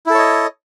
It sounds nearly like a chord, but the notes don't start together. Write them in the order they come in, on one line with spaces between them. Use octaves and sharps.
E4 A4 C#5 D#5